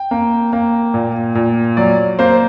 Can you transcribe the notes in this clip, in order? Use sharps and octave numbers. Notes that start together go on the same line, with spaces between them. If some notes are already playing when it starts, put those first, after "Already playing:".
Already playing: G5
A#3
A#3
A#2
A#2
F#3 D5
A#3 C5